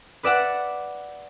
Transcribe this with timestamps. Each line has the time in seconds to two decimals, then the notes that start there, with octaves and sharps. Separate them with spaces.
0.23 B4 D5 E5 F#5